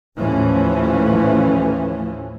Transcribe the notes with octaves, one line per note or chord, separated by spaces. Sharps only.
D#2 A2 E3 F3 A3 C#4